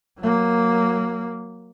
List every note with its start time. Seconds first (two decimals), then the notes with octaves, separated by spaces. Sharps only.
0.19 F#3 A#3